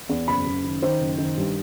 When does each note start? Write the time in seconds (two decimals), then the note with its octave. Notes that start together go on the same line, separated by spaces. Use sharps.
0.09 E2
0.28 F#1 B5
0.47 F#1
0.64 D#3
0.82 D#3 C5
1.00 F#1
1.18 D#3
1.37 G2